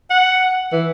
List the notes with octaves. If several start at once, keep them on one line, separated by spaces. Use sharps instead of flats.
F#5
E3